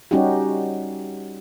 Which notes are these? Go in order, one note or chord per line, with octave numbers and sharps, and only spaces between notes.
G3 C#4 D#4 F#4 G4